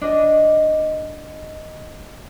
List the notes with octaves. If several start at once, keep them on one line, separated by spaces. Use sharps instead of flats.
D4 D#5